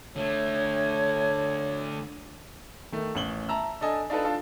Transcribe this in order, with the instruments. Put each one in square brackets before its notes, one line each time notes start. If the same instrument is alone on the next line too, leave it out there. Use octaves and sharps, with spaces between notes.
[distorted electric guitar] D3 A3 [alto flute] C#5
[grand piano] D#3 A3
A1 C#4 F#7 G7
E5 A5 A#5 E6
D4 A4 D#5 G#5
D4 D#4 F4 A4 B4
D4 F4 A4